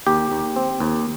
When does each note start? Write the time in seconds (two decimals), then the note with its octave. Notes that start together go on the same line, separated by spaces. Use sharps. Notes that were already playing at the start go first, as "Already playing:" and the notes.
0.07 D#2 G4
0.32 D#2
0.56 C4
0.80 D#2